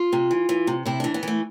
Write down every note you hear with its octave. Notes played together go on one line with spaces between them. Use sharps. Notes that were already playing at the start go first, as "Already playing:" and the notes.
Already playing: F4
C3
E3
E3
C3
C3 E4
E3 D4
B3
E3 A3